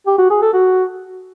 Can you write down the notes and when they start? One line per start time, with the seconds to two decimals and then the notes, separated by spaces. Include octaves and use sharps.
0.07 G4
0.18 F#4
0.30 G#4
0.42 A4
0.54 F#4